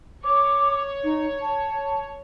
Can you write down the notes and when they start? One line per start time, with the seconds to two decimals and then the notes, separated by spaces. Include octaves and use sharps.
0.24 C#5 D6
1.04 D#4
1.42 A5